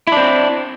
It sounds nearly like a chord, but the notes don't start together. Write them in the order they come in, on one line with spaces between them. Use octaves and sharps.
E4 D4 C4